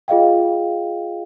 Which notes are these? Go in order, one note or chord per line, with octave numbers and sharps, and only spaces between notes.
F4 G#4 D#5 F5 G5